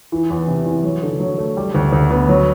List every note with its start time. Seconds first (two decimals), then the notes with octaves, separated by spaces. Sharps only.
0.12 E3
0.30 E2
0.48 C3
0.66 E2
0.84 F#3
1.03 D3
1.20 F#3
1.38 A3
1.57 G3
1.75 D2
1.93 D2
2.10 B3
2.29 F#3